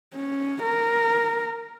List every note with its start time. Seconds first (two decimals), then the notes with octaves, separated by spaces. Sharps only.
0.14 C#4
0.63 A#4